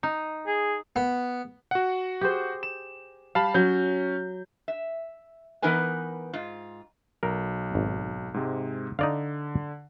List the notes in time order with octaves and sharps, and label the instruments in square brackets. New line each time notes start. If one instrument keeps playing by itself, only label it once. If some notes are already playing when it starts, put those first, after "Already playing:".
[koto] D#4
[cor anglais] G#4
[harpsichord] B3
[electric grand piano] F#4 F#5
[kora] G4 G#4 C5
[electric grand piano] E7
[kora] G3 [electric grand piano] F5 A5 B5
[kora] F#3 [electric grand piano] C#4 G6
[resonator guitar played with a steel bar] E5
E3 B3 D#4 A#4 B4 G#5
G#2 F4
[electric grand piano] B1 [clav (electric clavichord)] A#4
[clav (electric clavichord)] G#1
[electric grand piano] G#2 C3 G#3
[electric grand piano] D3 [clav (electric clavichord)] D#4 D5 F5